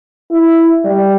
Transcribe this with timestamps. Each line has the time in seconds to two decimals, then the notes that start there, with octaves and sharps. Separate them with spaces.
0.31 E4
0.85 G3